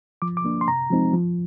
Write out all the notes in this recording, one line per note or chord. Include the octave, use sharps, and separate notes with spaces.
F3 D6
D6
A#3 D4
C6
C3 A#5
F3 G#3 C4 D#4
F3